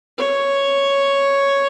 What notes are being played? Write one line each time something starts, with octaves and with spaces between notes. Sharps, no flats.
C#5